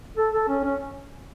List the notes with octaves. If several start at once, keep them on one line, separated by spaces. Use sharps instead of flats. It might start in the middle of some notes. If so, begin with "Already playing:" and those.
A4
A4
C#4
C#4